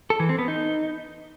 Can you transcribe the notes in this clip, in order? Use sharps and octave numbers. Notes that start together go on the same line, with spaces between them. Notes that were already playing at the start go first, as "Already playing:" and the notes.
A4
E3
C4
B3
D#4